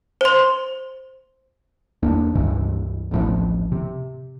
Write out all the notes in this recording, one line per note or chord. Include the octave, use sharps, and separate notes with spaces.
C5 C6
E1 E2 A#3 D4
C#2 G2 C3 E3
D1 A1 A2 F3
C3